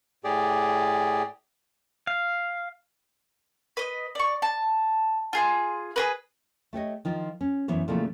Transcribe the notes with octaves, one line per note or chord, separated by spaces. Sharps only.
A2 G4 G#4 D5
F5
B4 D#5
D5 C#6
A5
F4 G#4 C6
G#4 A#4 B4
A3 G4 C#5 D#5
D#3 F3 F4
C#4
F#2 E3 B3 C5 C#5
A#2 C#3 E3 F3 A3 C4